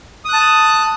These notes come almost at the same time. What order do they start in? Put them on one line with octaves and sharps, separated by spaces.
D#6 F#6 A5